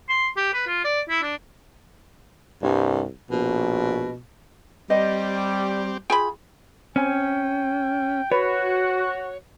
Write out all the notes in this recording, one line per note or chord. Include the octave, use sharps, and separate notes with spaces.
C6
G4
B4
F4
D5
E4
D4
C2 G2
A#1 B2
G3 C4 G4 D#5
F4 G#4 G5 G#5 B5
C4 C#4 G5 G#5
F#4 B4 C#5 F#5